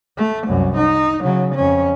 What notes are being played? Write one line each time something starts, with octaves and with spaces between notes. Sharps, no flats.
A3
C2 F#2
D#4
C#3 F#3
F2 C#4